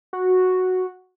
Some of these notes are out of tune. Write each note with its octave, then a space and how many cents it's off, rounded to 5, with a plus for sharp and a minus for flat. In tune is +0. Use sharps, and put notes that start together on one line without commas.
F#4 -5